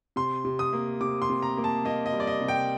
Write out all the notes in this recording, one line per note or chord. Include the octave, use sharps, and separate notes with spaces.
C3 C6
C3
D#6
A#3
C3 D6
C6
C3
A#5
A#3
A5
A#3 D#5
D#5
G3
D5
D#5
C3
G5